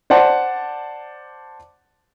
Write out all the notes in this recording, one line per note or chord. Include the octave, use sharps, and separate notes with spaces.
C5 D5 F#5 A5